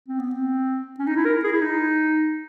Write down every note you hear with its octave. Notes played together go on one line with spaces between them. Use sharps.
C4
B3
C4
C#4
D#4
E4
A#4
G#4
E4
D#4